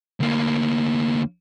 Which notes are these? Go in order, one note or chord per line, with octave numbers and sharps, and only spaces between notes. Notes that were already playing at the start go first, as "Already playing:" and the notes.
D2 A#3